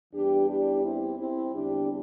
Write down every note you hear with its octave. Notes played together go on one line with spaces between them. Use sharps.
E2 E3 G3 D4 G4
D4 G4
C4 E4
C4 E4
E2 D3 G3 D4 G4